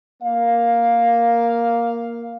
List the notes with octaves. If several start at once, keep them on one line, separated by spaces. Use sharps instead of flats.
A#3 F5